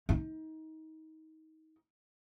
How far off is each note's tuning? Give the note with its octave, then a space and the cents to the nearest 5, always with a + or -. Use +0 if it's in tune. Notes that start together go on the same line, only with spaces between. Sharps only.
D#4 +25